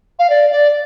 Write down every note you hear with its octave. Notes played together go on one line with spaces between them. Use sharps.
F5
D5
D5